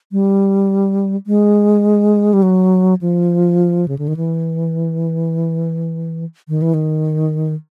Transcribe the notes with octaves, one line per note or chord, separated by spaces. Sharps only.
G3
G#3
G3
F#3
F3
C#3
D3
D#3
E3
D#3
E3
D#3